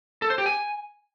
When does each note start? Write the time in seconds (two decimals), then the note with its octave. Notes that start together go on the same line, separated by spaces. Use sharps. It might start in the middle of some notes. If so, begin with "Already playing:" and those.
0.22 A4
0.30 C5
0.38 G4
0.46 G#5